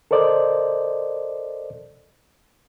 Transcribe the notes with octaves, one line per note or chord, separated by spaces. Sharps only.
A4 A#4 C5 D5 D#5